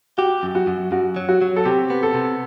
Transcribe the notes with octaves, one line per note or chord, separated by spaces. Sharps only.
F#4 G4
F#2
F#4
F#2
F#2 F#4
F#3
F#4
F#3
A4
C3 G4
B3
A4
C3